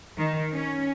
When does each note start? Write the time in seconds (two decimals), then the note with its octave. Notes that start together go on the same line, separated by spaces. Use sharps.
0.18 D#3
0.54 C#4